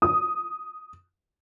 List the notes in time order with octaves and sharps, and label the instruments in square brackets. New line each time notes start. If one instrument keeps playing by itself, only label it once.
[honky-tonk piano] D#6